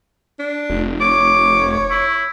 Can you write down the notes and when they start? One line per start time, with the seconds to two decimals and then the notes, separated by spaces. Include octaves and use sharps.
0.40 D4
0.70 F1
1.00 C#5 D6
1.91 E4